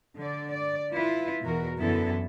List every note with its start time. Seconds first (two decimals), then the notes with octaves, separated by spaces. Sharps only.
0.19 D3 D5
0.52 D5
0.93 E4 F4 B4
1.43 E2 B2 F#4 A#4
1.78 F#2 D3 E3 B3 E4 A4